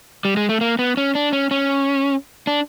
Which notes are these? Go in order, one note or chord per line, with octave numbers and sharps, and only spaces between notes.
G3
G#3
A3
A#3
B3
C#4
D4
C#4
C#4
D4